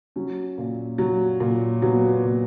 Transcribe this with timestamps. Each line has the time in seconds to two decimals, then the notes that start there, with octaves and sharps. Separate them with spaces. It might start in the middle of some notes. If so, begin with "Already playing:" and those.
0.16 F#3 C#4
0.58 A#2
0.98 F#3
1.40 A#2
1.82 F#3 B3
2.05 B3
2.24 A#2